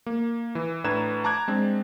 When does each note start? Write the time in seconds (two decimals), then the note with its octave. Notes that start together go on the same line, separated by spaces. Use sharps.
0.06 A#3
0.55 E3
0.84 A2 D4 B4 A#5 G#6 E7
1.24 A5 A#5 D6 F#6 G#6
1.48 G#3 C4 D4